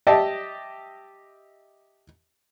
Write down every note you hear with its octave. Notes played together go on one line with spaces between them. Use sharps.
G4 D#5 E5 A5